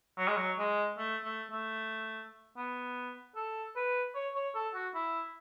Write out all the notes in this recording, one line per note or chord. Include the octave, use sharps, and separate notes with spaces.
F#3
G#3
F#3
G#3
A3
A3
A3
B3
A4
B4
C#5
C#5
A4
F#4
E4